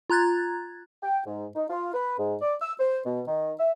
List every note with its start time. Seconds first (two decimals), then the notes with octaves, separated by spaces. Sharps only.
0.10 F4 A#5 F#6 G#6 A6
1.03 G5
1.26 G#2
1.56 D#4
1.70 F4
1.94 B4
2.19 G#2
2.41 D5
2.62 E6
2.80 C5
3.05 B2
3.28 D#3
3.59 E5